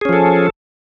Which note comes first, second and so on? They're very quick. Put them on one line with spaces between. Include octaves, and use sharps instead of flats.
G#4 C#4 F3 A4